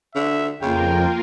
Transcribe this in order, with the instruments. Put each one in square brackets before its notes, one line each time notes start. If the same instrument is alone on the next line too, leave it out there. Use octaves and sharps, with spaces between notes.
[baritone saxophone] D3 [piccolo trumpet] E5
[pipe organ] F2 [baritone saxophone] C#3 [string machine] A#3 F4 A#4 [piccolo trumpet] G5